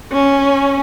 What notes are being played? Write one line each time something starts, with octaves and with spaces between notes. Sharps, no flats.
C#4